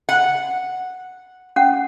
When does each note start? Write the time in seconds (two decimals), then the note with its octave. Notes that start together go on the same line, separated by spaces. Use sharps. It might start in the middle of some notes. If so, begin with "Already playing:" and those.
0.09 F#5
1.56 C#4 F#5